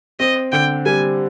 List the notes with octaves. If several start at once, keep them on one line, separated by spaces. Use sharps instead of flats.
C4 D#5
D3 G5
G3 G#5